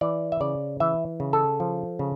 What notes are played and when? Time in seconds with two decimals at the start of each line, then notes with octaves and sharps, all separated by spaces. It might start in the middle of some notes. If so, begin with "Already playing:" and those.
0.01 E3 D5
0.32 E5
0.40 C#3 D5
0.80 E3 E5
1.20 C#3
1.33 A4
1.60 F3
1.99 C#3